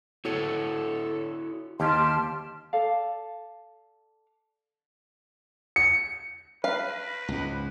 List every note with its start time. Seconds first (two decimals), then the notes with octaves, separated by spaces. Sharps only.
0.25 E4 F#4 A4 C#5
1.80 D#2 G4 A5 C6 F6
2.73 A4 D5 F5
5.76 C#7
6.64 B4 F5
7.28 C#2 G#2